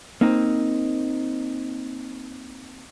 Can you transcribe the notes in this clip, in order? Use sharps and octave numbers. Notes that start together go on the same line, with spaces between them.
A#3 C4 D#4